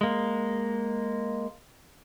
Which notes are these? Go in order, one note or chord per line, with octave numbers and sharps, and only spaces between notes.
G#3 A#3